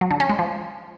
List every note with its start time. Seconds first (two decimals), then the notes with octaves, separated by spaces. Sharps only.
0.01 F#3
0.11 D3
0.20 C#4
0.29 G#3
0.39 F3